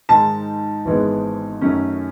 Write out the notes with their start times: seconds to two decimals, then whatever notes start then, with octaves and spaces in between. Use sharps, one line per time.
0.09 G#2 D#3 G#3 A5
0.85 G#1 G#2 E3 G#3 B3
1.61 F#2 D#3 A3 C#4